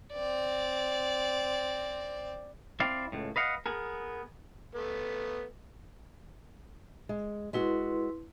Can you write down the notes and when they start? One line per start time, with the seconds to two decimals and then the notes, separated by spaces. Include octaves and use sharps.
0.13 C4 D5
2.80 C4 E4 D5 F5
3.12 C#2 A2
3.36 B4 D#5 F5 F#5
3.66 B3 G#4 A#4
4.75 A3 B3
7.09 G#3
7.53 G#3 E4 F#4 B4 C6